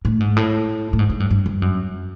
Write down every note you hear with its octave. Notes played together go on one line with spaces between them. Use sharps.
A2
G#2
A2
A2
G#2
G#2
G2
G2
G2
F#2